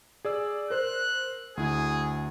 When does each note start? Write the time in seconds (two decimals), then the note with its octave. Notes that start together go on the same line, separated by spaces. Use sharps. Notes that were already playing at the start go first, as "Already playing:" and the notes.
0.25 G#4 D5 E6
0.70 A#4 C5 F#6
1.57 D2 E4 G#4